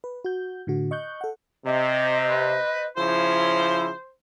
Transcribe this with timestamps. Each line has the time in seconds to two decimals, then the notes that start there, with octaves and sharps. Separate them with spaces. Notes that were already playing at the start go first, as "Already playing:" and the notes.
0.04 B4
0.24 F#4 G6
0.67 A2 D3 F#4
0.91 D#5 C#6 F#6 G6
1.21 A4 F#5
1.65 C3 C5 D#5
2.28 B4
2.97 C#3 F3 E4 C5 C#5